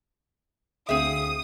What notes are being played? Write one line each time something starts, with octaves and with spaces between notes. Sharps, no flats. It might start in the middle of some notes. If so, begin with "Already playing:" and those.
D2 C4 G#4 E5 F5 D#6